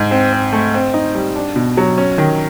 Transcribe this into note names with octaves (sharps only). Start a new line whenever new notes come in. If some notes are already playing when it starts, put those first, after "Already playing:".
Already playing: G#2
C4
C4
A3
C4
D#4
G3
D4
B2
F#3
C#4
D#3